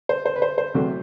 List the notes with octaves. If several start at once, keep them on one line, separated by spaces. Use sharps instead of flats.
C5
C5
B4
C5
C5
E2 C3 F#3 A3